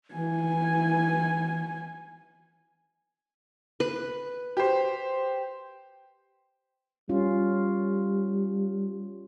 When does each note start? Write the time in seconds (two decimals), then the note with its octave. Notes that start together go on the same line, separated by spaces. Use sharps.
0.15 E3 G#5
3.80 B4
4.57 G4 C5
7.09 G3 C#4 F4